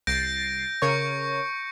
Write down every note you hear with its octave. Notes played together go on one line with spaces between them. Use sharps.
C2 G6 A6 A#6 C7 D7
C#3 A#4 C#5 C#6 C#7